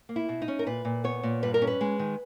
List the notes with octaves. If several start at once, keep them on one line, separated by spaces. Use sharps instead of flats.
A#3
E4
B2
D#4
C#4
A#4
A#2 B4
A#2
B3 C#5
A#2
G2 B4
A#4
C#4
B4
G#3
D#3